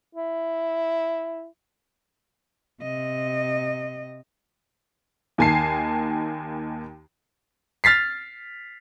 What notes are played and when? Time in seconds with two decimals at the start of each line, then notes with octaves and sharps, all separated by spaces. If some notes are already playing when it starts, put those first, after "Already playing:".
0.15 E4
2.82 C3 D#5
5.38 D#2 D#3 G#5 A5 C7
7.84 F6 A6 B6 C7